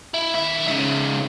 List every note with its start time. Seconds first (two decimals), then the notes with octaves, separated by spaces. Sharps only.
0.14 E4
0.34 D#3 E5
0.67 G#2 C#3